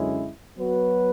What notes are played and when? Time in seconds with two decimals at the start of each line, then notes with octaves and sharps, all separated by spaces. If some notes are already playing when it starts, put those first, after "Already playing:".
Already playing: F#2 D3 G#3 C#4 E4
0.59 F#3 B3 F#4 B4